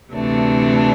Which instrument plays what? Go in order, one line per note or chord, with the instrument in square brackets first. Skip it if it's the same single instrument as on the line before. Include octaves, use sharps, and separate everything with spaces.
[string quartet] D2 C3 E3 A3 D4